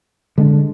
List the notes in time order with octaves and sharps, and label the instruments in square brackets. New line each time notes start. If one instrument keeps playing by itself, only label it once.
[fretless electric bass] D3 G#3 B3 D4